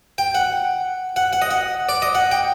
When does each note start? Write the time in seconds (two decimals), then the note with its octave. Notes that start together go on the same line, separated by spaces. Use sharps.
0.18 G5
0.35 F#5
1.16 F#5
1.33 F#5
1.42 D#5
1.51 F#5
1.89 D5
2.02 D#5
2.15 F#5
2.31 G5